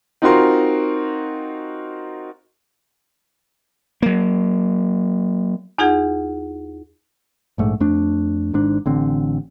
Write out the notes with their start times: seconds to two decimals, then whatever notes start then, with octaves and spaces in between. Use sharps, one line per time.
0.22 C4 D#4 F4 F#4 A#4 C6
4.02 F#3 A#3
5.78 E2 D#4 F4 G#4 F#5 G#6
7.58 A#1 G#2 A3
7.80 F2 A3 D4
8.53 G#1 G#2 D4
8.86 A1 D3 C4